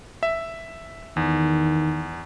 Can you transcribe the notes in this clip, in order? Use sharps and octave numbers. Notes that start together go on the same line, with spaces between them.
E5
E2 D#3